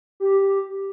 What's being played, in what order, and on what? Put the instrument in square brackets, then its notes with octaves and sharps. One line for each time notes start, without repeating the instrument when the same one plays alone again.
[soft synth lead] G4